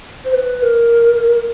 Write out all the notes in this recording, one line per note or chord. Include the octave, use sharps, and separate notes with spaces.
C5
B4
A#4